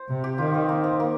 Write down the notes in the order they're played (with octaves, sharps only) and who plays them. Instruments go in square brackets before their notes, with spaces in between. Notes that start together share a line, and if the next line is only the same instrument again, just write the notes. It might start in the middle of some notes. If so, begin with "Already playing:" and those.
Already playing: [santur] C5
[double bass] C3
[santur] G4
[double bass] D#3 [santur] F4
[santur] C4
A#3
C4
A#3